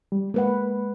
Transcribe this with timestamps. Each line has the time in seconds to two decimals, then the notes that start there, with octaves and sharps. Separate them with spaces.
0.12 G3
0.34 G#3 A#3 B4 F#5